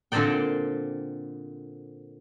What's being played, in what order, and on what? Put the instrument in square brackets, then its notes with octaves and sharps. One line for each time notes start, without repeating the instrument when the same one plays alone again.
[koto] A#2 D3 C4 C5 D5 G5